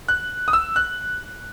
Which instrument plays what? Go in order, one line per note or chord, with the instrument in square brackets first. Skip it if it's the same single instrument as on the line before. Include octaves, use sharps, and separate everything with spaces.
[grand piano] F#6
D#6
E6
F#6